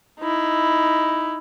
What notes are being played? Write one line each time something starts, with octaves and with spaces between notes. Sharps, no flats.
D#4 E4